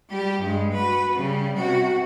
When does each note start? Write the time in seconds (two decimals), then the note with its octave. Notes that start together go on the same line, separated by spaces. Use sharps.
0.10 G3 G4
0.40 G2 G#3
0.73 F#4 B4
1.15 C#3 G3
1.57 C3 F#4